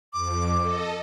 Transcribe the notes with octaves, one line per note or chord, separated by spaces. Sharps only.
F2 D6
A4 D#5